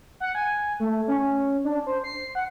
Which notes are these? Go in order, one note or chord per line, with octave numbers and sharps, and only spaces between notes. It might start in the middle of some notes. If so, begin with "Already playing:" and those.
F#5
G#5
A3
C#4
D4
C5
C7
F#5